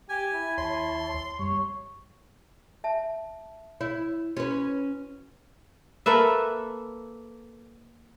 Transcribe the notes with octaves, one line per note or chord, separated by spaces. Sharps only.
G4 G#5
E4
D#2 C#5 A5 C6
F#2 G3 C#5
E5 A5
E4 C#5
C#4 F#4 B4
A#3 A4 B4 E5